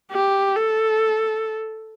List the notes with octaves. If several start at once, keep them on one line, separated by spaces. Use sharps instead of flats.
G4
A4